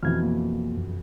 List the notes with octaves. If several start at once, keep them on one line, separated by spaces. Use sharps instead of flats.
F2 B2 E3 F6 G#6
A#3
F#2